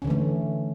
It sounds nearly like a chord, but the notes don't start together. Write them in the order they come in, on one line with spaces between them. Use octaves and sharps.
C#4 D3 E3 A3